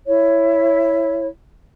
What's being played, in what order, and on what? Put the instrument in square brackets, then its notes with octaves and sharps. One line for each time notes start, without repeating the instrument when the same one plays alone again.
[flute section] E4 C#5